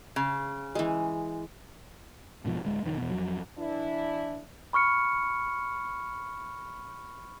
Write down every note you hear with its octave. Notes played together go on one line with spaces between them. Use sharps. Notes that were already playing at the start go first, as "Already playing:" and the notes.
C#3
E3 G#3
E2 G#2 B2 F3
D1 G#3
F1 A#1 A#2 D#3
E2 B2
F2 F#3
E3 D4 E4
B5 C#6 F6 C#7